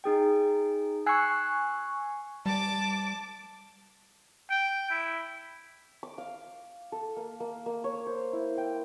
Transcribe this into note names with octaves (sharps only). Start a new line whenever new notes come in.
D#4 G#4 G5
G#5 C#6 E6 F#6 C7
G3 A5 D6
G5
E4
D6
F5
A4
A#3
A#3
A#3
C#5
C5
E4
G5